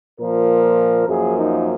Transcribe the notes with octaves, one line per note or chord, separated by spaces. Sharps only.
A#2 F3 A#3 A#4
F#2 F3 A#3 G#4
D#4